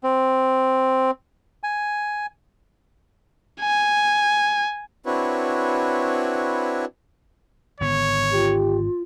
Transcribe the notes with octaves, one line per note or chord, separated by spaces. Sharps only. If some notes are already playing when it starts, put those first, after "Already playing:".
C4
G#5
G#5
C4 D4 E4 F#4 B4 C#5
G#1 D3 B3 C#5
F4 G4